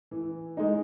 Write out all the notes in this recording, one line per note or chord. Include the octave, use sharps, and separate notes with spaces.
E3
G#3 D#4